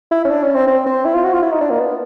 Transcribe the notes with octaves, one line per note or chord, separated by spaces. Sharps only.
E4
C#4
D4
C#4
C4
C4
C4
E4
F4
F#4
F4
E4
D#4
D4
A#3
B3